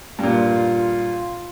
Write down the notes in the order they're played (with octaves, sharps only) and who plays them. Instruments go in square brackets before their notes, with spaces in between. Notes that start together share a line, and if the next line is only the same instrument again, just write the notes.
[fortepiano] G2 A#2 [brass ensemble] F4